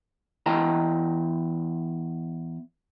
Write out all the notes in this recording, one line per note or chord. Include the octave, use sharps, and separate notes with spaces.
E2 E4 D#5 G5 A5 A#5